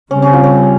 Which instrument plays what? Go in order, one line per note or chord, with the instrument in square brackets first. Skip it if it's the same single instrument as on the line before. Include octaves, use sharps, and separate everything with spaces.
[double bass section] C#3 G3 C4 [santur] C#4
[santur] C#4
F4
C#4